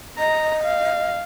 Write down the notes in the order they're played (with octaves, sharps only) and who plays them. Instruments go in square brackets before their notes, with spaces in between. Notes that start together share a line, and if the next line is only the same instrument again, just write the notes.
[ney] D#5 [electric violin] A#5
[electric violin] F5